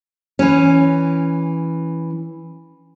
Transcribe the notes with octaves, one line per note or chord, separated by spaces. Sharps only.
E3 C#4